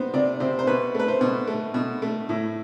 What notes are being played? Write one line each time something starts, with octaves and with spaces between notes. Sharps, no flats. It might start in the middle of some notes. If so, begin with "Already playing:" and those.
Already playing: C3 B3 C5
C3 D5
C3 C5
C5
B2 B4
A3 B4
C5
B2
A3
B2
A3
A2